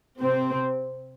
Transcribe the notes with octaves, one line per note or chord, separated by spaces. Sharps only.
C3 C4